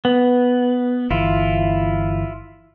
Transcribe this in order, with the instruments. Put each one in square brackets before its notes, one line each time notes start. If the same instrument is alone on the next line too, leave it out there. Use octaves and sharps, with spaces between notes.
[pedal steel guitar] B3
[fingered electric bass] G1 E3 [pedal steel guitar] E4 F4